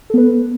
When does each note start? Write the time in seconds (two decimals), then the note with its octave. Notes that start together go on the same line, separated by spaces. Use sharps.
0.10 A4
0.14 B3
0.18 B4